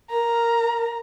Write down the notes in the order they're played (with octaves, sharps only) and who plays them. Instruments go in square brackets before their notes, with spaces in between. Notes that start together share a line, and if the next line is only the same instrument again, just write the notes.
[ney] A#4 [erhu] A#5